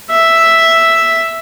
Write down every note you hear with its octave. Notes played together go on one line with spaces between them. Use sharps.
E5